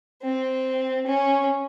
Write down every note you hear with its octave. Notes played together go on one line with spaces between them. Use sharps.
C4
C#4